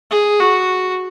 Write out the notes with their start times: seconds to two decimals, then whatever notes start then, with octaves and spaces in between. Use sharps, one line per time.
0.11 G#4
0.40 F#4